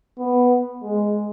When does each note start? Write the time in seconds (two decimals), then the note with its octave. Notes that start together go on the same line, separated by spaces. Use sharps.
0.18 B3
0.83 G#3